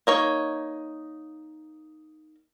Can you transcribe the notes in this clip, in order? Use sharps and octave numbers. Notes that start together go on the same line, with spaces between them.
A#3 D#4 C#5